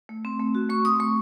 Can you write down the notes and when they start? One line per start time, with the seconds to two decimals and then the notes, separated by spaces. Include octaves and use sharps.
0.09 A3
0.25 C4
0.39 A3
0.55 F#4
0.70 A3 C#6
0.85 C4 D#6
1.00 A3 C#6